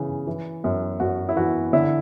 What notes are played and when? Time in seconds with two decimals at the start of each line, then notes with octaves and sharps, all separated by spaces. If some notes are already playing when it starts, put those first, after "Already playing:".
Already playing: C#3 E3
0.27 E3
0.64 F#2
1.00 F#2 F#4
1.29 E4
1.36 E3 F#4
1.73 D3 E4